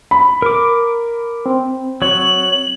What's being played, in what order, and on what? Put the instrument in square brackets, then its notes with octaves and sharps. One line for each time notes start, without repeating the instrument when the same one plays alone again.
[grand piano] B5
[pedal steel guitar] A#4 D6
[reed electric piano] C4
[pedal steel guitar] F#3 C#5 [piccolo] F#7